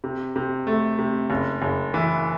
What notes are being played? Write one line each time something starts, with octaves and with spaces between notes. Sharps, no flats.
C3
C3
A3
C3
F#1
F#1
E3